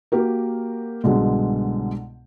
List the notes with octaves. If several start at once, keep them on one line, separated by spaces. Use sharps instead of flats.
A#3 F#4 G4 A#4
C2 G#2 B2 D3 G#3